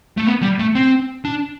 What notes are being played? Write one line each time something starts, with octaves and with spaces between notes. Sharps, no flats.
A3
B3
G3
A3
C4
D4